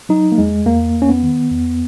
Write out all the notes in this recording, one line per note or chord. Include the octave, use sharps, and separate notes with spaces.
F#3 D#4
A#3
E2 G#3
E2 A#3
E2
C#4
B3
D#3
E2